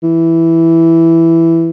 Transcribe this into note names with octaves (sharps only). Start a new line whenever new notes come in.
E3